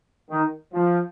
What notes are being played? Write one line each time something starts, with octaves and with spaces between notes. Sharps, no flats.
D#3
F3